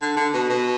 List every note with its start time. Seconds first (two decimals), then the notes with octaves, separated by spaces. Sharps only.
0.02 D3
0.17 D3
0.34 B2
0.50 B2